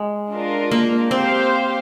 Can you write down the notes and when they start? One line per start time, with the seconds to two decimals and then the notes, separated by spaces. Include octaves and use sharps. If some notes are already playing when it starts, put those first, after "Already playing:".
Already playing: G#3
0.31 D4 F4 A#4
0.71 A#3
1.11 C4 G4 C5 F5